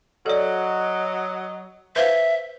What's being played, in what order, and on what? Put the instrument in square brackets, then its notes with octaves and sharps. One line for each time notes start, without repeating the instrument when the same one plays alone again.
[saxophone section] F#3 D#5 [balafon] A4 D5
[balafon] B4 C5 F5 [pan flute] E5